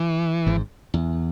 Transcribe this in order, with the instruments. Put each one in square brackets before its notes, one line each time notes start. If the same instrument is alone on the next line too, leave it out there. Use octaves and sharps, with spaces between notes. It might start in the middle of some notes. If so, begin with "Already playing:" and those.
Already playing: [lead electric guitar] E3
[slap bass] G#1 G#2
E2